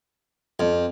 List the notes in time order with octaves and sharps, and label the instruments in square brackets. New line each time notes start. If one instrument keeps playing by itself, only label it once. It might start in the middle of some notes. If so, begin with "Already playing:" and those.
[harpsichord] F2